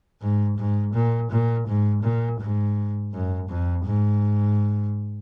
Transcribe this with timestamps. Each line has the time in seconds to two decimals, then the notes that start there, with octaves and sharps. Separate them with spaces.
0.21 G#2
0.58 G#2
0.94 A#2
1.31 A#2
1.67 G#2
2.03 A#2
2.40 G#2
3.13 F#2
3.49 F2
3.85 G#2